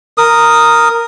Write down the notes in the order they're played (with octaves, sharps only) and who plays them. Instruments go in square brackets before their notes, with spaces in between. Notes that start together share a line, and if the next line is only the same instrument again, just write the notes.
[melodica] A#4 D#6